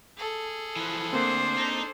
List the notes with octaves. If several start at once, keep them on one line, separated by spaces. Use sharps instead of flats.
G#4 A4
E3 F3
D2 A#3 C4 D4 C5
D#4